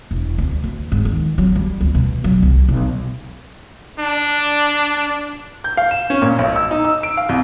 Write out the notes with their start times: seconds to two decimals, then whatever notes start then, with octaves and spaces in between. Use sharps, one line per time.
0.11 E1
0.38 D2
0.64 D2
0.92 G#2
1.05 D#3
1.38 F#3
1.55 G3
1.81 D2
1.95 B2
2.24 F#3
2.42 C2
2.68 B1
3.99 D4
5.64 G6
5.77 F5
5.91 E7
6.10 C#4
6.22 A#2
6.39 B1
6.56 E6
6.71 D#4
6.84 E6
7.03 D7
7.17 F5
7.29 C2